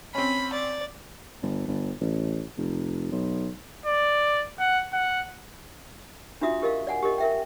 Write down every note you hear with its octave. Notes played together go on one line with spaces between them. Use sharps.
C4 C#4 B5
D5
G1
G1
A1
F1
B1
D5
F#5
F#5
D4 F4 F#4 E5 D#6
G4 A#4 D#5 F5
D5 F#5 G#5
G4 A#4 D#5
A#4 E5 G5